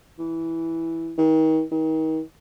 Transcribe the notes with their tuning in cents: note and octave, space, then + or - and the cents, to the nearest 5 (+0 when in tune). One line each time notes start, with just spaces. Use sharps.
E3 -5
D#3 +35
D#3 +35